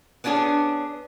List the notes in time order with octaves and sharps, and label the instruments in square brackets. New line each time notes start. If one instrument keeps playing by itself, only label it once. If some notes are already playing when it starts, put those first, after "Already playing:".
[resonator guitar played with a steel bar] B3 C#4 D4 G4 G#4